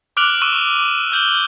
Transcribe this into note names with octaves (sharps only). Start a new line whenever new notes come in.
D6 F6 F#6 D7 F7 F#7
C#6 D6 E6 F#6 D#7 E7
F6 G6 F#7 G7